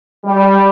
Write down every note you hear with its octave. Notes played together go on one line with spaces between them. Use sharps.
G3